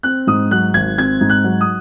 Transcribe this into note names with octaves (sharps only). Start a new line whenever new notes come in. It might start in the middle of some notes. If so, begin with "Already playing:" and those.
C4 F#6
G#2 D#6
F#3 F#6
G#1 G#6
C4 G#6
G#2
F#6
F#3
D#6